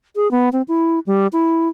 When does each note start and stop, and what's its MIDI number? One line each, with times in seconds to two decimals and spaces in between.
0.16 0.30 68
0.31 0.49 59
0.53 0.62 60
0.68 0.99 64
1.06 1.27 55
1.33 1.69 64